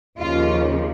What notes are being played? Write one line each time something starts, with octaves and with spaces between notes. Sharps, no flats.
D#2 C#3 F3 F4